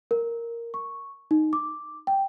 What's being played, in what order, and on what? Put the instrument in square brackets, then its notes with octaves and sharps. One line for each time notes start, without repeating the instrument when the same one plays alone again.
[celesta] A#4
C#6
D#4
D6
G5